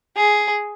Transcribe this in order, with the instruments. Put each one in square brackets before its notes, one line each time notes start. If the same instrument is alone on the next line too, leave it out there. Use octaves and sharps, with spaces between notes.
[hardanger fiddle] G#4